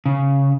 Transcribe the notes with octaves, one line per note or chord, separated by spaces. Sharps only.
C#3